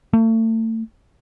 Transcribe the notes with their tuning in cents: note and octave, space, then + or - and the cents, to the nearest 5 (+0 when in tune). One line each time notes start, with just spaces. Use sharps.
A3 +35